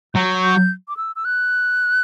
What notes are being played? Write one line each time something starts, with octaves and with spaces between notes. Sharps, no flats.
F#3 G6
G6
D6
E6
E6
F#6